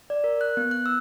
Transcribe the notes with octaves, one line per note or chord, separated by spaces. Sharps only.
D5
A#4
F#6
B3
F#6
E6